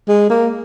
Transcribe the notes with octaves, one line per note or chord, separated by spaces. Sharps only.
G#3
A#3